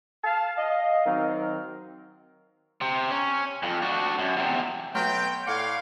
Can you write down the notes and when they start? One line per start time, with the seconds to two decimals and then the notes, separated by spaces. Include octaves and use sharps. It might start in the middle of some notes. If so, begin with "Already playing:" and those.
0.24 F5 A5
0.57 D#5 F5
1.06 D#3 F#3 C4 A#4
2.81 C3
3.11 C#4
3.63 F2
3.82 D4 F#4
4.19 F#2
4.37 E2 C3
4.95 B2 F#3 A3 G5 C6 F6
5.47 A2 D5 F5 F#5 G#6